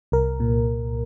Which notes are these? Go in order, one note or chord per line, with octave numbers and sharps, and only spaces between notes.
C2 A#4
A#2